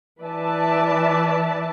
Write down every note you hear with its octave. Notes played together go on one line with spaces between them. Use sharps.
E3 B4 D5 E5 A5